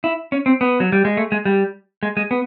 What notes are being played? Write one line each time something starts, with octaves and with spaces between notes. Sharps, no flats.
E4
C#4
C4
B3
F#3
G3
G#3
A3
G#3
G3
G#3
G#3
B3